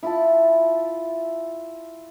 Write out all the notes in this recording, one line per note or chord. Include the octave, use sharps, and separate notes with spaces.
E4 F4 A5